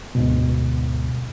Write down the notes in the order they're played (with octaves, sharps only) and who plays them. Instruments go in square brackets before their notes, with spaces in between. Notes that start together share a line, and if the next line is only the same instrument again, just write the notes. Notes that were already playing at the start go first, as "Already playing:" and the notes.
[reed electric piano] D2 G#2 B2